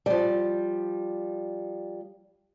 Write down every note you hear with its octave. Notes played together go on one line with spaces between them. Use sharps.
F3 G3